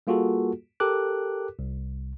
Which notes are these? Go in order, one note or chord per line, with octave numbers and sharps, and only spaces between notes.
G3 A#3 F4 F#4 G#4 A4
G4 A4 A#4 D6 F#6
C2